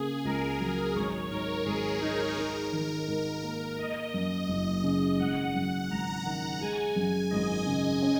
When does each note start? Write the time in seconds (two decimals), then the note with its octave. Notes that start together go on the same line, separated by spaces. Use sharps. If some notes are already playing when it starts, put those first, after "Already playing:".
Already playing: C#3 A#3 G#4
0.25 C#2 A#4
0.60 F#3
0.95 G#1 C#5
1.31 G#2 A#4
1.66 G#1 G#4
2.01 G#3 D#4
2.37 D#4 A#4
2.72 D#3
3.08 G#2
3.43 A#3
3.78 A#3 D#5
4.14 F#2
4.49 F#1
4.83 C#3
5.20 G#1 F#5
5.55 F#2
5.90 G#1 A#5
6.25 D#3
6.61 G#3 G#5
6.96 F#2
7.31 G#1 D#5
7.66 C#3
8.02 C#4